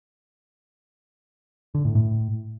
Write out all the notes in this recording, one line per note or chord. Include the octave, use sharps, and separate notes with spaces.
D3
A2
A2